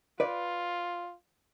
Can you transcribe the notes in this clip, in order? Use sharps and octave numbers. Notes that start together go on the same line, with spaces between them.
F4 B4 D5